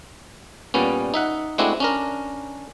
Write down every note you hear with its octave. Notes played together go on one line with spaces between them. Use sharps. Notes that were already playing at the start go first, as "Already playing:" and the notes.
A#2 G3 B3 C#4
D#4 E5 F#5
G#3 A3 C4 D4 E4 F#4
C#4 D4 A#4